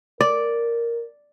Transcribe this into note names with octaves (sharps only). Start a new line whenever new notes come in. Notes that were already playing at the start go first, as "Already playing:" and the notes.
A#4 D5